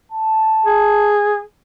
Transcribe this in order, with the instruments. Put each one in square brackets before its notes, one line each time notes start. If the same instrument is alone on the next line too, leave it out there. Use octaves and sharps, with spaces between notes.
[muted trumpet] A5
[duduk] G#4